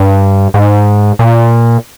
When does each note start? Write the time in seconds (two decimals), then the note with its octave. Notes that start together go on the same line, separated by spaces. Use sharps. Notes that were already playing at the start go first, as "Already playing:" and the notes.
Already playing: G2
0.54 G#2
1.19 A#2